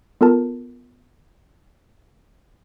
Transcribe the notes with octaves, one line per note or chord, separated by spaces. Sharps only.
B3 F4 A4 A#4 A5